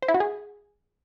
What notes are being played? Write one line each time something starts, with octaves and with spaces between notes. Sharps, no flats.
C5
E4
F#4
G#4